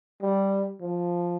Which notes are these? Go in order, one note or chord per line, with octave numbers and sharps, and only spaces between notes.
G3
F3